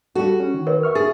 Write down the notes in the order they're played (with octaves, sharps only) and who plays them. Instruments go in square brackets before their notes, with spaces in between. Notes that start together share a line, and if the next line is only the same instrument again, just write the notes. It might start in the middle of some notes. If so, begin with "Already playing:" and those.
[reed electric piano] G3 G4 A4 [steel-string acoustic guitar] F#4
[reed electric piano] C#4
D#3
[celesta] A#4 B4 C#5
[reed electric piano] E5 C#6 F6
[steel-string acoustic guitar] G#4 [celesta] A6